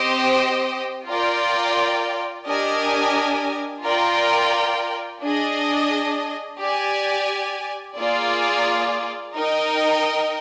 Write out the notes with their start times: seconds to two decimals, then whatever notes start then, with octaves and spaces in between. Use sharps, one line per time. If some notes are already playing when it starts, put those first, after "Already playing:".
Already playing: C4 G4 C5 D#5 G5
1.07 F4 A#4 D5 G5
2.46 D4 G4 A#4 D#5 G#5
3.83 F4 A#4 D5 G5
5.22 D4 G#4 D#5
6.60 G4 D5 G#5
7.97 A#3 F4 G#4 D5
9.35 D#4 A#4 D#5 G5